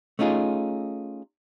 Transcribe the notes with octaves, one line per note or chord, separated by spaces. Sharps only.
A3 C#4 D#4 F4 G#4